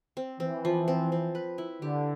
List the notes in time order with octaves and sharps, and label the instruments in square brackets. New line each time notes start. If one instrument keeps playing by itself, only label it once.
[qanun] C4
[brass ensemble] E3 [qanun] C4
[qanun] F3
C4
C4
B4
E4
[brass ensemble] D3 [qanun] G4